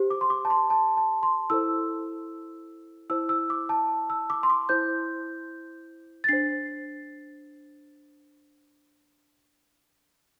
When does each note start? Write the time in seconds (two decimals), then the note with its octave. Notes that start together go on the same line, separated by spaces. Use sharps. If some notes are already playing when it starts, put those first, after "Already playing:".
Already playing: G4 C5
0.10 D6
0.21 C6
0.30 D6
0.45 A5
0.50 C6
0.70 A5
0.97 A5
1.23 C6
1.50 E4 A4 C5 E6
3.10 E4 C5 E6
3.29 E6
3.50 D6
3.69 A5
4.10 E6
4.30 D6
4.43 C6
4.50 D6
4.69 E4 C5 G6
6.24 A6
6.29 D4 C5 C7